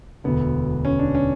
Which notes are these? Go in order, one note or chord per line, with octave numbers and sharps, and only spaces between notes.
E1 D2 D3 B3
C#4
D4
C#4